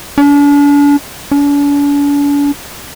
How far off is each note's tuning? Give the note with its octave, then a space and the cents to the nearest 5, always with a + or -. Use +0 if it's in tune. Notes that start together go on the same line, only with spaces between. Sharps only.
D4 -40
D4 -45